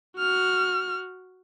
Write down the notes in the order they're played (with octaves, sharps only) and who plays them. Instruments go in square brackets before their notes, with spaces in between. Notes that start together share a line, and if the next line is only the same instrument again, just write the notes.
[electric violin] F#4 F6